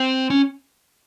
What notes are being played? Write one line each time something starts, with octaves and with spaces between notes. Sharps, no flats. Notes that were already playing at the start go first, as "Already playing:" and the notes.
Already playing: C4
C#4